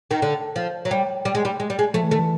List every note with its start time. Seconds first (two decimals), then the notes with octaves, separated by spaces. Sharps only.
0.11 D#3
0.22 D3
0.56 F3
0.85 F#3
0.91 G3
1.25 G3
1.35 G#3
1.45 G3
1.60 G#3
1.70 G3
1.79 G#3
1.94 F3 A3
2.03 E3
2.11 D#3 A3
2.19 E3